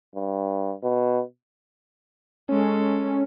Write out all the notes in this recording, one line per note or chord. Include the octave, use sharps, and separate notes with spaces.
G2
B2
G#3 C#4 A4